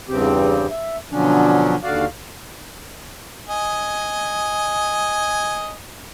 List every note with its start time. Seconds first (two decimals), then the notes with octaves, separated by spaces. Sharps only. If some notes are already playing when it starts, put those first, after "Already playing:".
0.09 E2 G2 C#3 C4 G4
0.70 E5
1.11 B2 D3 F3 F#3 C#4 D4
1.83 D#2 D3 F#4 D5 F5
3.49 D#5 G#5